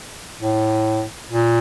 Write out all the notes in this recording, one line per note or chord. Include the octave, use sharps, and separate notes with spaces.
A2
A#2